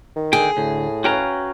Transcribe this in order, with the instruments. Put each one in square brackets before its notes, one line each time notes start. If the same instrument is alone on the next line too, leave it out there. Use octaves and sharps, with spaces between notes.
[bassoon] D#3
[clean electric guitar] D3 G5 [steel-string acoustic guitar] G#4
[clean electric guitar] D2 [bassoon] A2
[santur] C#4 B4 F5 [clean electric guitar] F#4 G5 A#5